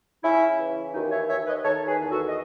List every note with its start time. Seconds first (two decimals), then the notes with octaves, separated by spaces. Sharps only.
0.23 C#3 C#4 E4
0.59 E3
0.94 D#2 D#4 F#4
1.11 C#5 E5
1.29 D#2 C#5 E5
1.47 B4 D#5
1.64 D#3 A4 C#5
1.88 G#4 B4
2.00 E2
2.11 F#4 A4
2.29 D#5